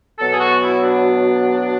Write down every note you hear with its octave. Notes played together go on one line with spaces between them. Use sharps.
B2 F#3 B3 A4
G#4
F#4
E4
D4